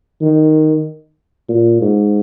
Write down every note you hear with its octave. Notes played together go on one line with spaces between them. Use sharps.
D#3
A#2
G#2